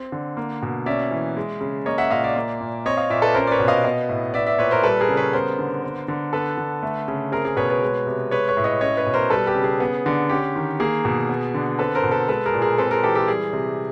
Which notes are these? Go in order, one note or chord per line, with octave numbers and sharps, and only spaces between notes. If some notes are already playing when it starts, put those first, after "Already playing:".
Already playing: C4
D3
A#3
B2
C#4 D5 E5
E3
G#3
C#3
A#3 C#5 D#5
E5 F#5
A#2 D#5 F5
D5 E5
A#3
A#2
C4 C#5 D#5
D#5 F5
A#2 D5 E5
A4 B4
C#4 A#4 C5
D5
B4 C#5
B2
D#5 F5
B3 D#5 F5
A2
B3 D5 E5
D5 E5
A#2 B4 C#5
A#4 C5
G3 A4 B4
G#4 A#4
C#3
B4 C#5
B3 A#4 C5
D3
B3
D3
B3 A4 B4
D3
A3
C#3
C4 G#4 A#4
G#4
B2 B4 C#5
B4 C#5
G#3
C3
G#3 B4 C#5
B4 C#5
A2
C#5 D#5
C#4 C#5 D#5
B4 C#5
B2
A#4 C5
G3 A4 B4
G4 A4
C#3
G#4
B3
D3
C#4 G4
D#3
A#3 G#4
B2
B3
D3
C4 A4 B4
A#4 C5
B2
A4 B4
G#3 A4 B4
G#4 A#4
A#2
G#4 A#4
C4 A4 B4
G#4 A#4
E3 G4 A4
G4 A4
G3 G#4
C3